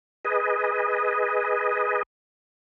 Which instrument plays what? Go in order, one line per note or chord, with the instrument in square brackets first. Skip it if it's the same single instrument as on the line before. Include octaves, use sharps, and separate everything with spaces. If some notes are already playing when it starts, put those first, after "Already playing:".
[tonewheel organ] G#4 B4 D#5